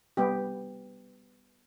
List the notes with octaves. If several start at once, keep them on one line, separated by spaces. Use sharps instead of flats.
G3 B3 G4